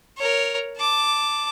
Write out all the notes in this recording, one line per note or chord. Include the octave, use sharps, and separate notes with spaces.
A#4 C#5
A5 D6